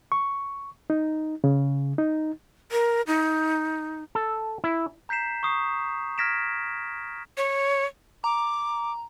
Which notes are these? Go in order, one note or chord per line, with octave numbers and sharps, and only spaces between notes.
C#6
D#4
C#3
D#4
A#4
D#4
A4
E4
A#5 G6 B6 C7 E7
C#6 D#6 C7
F6 G#6 A#6 B6 D7 E7
C#5
A#5 D6